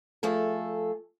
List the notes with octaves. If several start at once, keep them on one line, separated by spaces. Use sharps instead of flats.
F3 A3 G#4 A4